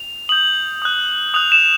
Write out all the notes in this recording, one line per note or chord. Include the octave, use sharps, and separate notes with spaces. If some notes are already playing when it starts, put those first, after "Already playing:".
Already playing: F7
D#6 G6 F#7
D#6 F#6
D#6 F#6 F7
E7